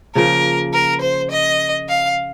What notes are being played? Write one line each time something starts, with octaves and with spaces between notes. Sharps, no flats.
C#3 F3 A#3 A#4
A#4
C5
D#5
F5